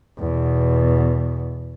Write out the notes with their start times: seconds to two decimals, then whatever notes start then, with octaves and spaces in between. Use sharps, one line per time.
0.19 E2 B2